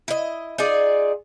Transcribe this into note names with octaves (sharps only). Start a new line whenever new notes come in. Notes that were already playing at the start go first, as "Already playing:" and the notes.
E4 D#5
D#4 F4 G#4 D5